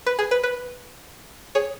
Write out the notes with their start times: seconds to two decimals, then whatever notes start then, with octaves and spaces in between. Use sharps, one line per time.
0.06 B4
0.19 G#4
0.31 B4
0.43 B4
1.55 G#4 C#5